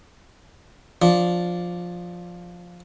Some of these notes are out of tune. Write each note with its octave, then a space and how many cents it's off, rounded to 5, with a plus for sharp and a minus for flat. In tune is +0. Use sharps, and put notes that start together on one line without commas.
F3 +10 D4 +0